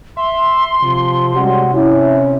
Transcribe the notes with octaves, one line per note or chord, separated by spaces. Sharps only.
E5 C6
C3 F3
G3 G#3 C#4 F#4
C#4 E4